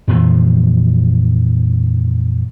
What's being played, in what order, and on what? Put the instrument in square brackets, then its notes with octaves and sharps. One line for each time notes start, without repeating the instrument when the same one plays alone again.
[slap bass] F2 A#2 E3 F3